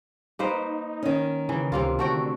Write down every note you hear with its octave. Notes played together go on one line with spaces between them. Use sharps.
A#3 D#4 B4 C5
D#3 C#4
C#3 E3
C#2 C3 A#3 F4
D3 A3 F#4 G5